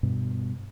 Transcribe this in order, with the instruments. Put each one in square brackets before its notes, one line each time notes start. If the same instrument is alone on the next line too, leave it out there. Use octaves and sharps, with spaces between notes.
[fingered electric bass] G2 B2